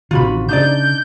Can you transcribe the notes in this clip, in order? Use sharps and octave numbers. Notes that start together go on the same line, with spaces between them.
A1 C3 D#3 F4 F#4 B5
C#3 D4 D#4 D5 G6